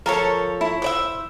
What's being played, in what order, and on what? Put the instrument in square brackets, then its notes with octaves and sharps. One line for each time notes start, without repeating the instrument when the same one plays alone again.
[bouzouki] F3 A4 C#5 [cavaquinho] A#4
[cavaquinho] E4
[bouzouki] C5 D5 E5